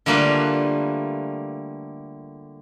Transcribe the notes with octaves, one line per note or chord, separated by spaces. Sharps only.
D3 G3 A3 A#3 F4 B4